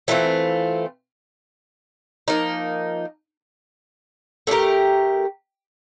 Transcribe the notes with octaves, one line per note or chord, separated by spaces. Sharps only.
E3 A3 C4 F4
F3 A#3 D#4
A3 D4 G4 A#4